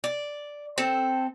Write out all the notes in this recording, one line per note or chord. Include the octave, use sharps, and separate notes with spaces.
D5
C4 A4